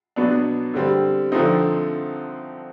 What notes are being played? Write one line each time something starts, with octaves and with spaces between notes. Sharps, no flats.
B2 F#3 B3 D4
D3 G3 C4
D3 F3 A3 C4 D#4